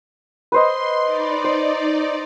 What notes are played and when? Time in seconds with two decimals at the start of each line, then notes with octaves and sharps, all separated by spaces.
0.52 B4 C5 D#5 C6
1.01 D#4 D5
1.44 C5